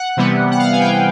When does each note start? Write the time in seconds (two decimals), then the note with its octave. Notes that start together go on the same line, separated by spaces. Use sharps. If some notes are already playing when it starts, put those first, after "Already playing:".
Already playing: F#5
0.17 C3 E3 G3 B3
0.51 F#5
0.59 F5
0.73 G#5
0.80 G5